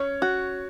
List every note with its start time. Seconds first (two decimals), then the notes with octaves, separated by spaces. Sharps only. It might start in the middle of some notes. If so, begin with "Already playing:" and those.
Already playing: C#4 C#5
0.22 F#4